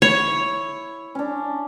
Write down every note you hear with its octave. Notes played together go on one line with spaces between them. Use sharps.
E4 C#5
C#4 D4